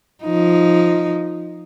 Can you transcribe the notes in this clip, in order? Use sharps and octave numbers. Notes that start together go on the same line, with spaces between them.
F3 D#4